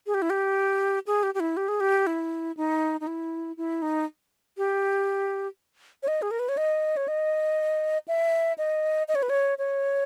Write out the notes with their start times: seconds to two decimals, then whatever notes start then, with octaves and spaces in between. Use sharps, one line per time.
0.07 G#4
0.14 G4
0.22 E4
0.30 G4
1.07 G#4
1.23 G4
1.34 G4
1.40 E4
1.57 G4
1.68 G#4
1.80 G4
2.07 E4
2.57 D#4
3.00 D#4
3.07 E4
3.57 E4
3.82 D#4
4.57 G4
6.03 C#5
6.08 D#5
6.22 G#4
6.31 A#4
6.39 B4
6.49 C#5
6.57 D#5
6.97 C#5
7.08 D#5
8.08 E5
8.58 D#5
9.08 D#5
9.15 C#5
9.23 B4
9.29 C#5
9.58 C#5